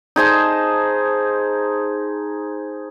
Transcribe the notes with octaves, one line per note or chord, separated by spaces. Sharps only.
D#4 G#4 C5 A5